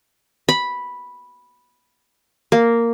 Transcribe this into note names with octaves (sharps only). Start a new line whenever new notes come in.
B5
A#3